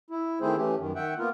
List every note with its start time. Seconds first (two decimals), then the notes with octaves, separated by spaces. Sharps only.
0.10 E4
0.41 D#3 A3 C4 E4 G#4 C5
0.56 E3 A3 C#4 G4
0.78 F#2 D#3
0.96 D#3 E5 F#5 G5
1.18 A#3 B3 F4 A#4